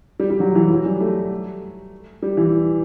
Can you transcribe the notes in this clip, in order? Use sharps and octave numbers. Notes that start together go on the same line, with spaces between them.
G3
G3
F#3
E3
F#3
G3
A3
G3
E3